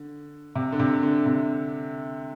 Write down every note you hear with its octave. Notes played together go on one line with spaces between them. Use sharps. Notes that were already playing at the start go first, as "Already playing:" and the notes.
Already playing: D3
C3
D3
C3
D3
C3